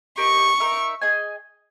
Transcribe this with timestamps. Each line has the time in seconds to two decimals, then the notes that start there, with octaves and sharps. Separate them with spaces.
0.17 G4 A#4 D#5 C#6
0.60 D#4 A#4 E5
1.02 G#4 D#5 G#5